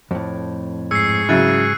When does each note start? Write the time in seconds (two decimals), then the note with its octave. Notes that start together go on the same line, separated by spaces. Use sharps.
0.11 F2 A2
0.91 G#2 G#4 C#6 E6 C7
1.29 C#3 F#3 E4 F#6 A6 D#7